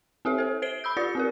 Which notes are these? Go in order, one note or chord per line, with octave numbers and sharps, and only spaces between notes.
C4 G4 A4 E5
A4 C5
C5 C7 D7 G7
B5 E6 G6
F4 G4 D5 A6 C#7
C4 G4 A#4